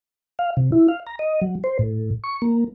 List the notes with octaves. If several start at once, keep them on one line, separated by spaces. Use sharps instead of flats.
F5
C3
E4
F5
A#5
D#5
F#3
C5
A2
C#6
A#3